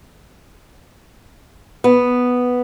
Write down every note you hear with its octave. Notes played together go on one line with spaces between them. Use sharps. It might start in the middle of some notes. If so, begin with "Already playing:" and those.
B3